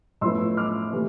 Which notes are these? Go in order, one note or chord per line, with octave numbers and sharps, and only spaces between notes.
A2 F3 B3 C6 E6
D6 F6
C3 E3 A3